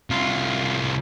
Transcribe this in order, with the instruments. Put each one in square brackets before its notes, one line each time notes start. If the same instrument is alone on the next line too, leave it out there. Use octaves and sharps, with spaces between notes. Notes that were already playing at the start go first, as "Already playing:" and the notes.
[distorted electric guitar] C2 F4